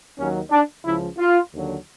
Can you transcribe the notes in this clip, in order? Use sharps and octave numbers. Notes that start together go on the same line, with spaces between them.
D#2 D#3 F#3 C#4
D4
C#2 C#3 F3 E4
F4
D#2 D3 F#3